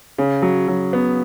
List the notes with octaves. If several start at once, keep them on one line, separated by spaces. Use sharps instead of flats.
C#3
F#3
F#3
B3